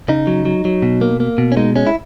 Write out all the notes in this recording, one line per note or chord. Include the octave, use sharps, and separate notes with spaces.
C#3 D#4
F#3
F#3
F#3
B2
A#3
A#3
B2
C#4
G#3 D#4
G#3 C#4
E4